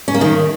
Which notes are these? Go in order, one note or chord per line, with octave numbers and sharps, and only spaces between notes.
C#4
A#3
D#3